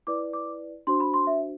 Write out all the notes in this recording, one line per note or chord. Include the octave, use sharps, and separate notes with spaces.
E4 B4 D5 D6
D6
D4 F#4 C5 C6
B5
C6
E5